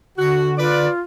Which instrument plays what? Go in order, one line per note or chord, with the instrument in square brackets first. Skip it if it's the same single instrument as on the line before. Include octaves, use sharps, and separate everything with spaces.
[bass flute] D3 [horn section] F#4
[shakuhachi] F4 [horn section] B4 D5